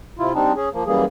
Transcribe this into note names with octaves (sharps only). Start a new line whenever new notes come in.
C3 E4 F4
G3 C4 D4 D#4
C#4 G#4
F3 A#3
F#2 E3 G3 A#3 G#4